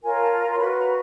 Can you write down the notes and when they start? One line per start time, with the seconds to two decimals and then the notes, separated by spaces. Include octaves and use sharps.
0.02 F4 A#4 C#5 G#5
0.13 G#5
0.20 A5
0.40 A#5
0.52 C6
0.58 F#4 B4 B5
0.77 A#5